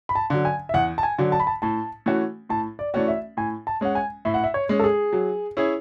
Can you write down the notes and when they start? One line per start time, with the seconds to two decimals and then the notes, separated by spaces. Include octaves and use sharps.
0.09 B5
0.15 A5
0.30 D3 F#3
0.45 G#5
0.69 E5
0.74 E2 F#5
0.98 A5
1.03 G#5
1.18 D3 F#3
1.32 A5
1.40 B5
1.47 A5
1.62 A2 A5
2.06 E3 A3 C#4 F#4
2.49 A2 A5
2.79 D5
2.94 E3 A3 C#4 F#4 D5
3.08 E5
3.37 A2 G#5
3.67 A5
3.81 G#3 C#4 F#5
3.95 G#5
4.25 A2 E5
4.34 F#5
4.44 E5
4.54 C#5
4.69 G#3 C#4
4.79 A4
4.84 G#4
5.13 F#3
5.57 C#4 E4 G#4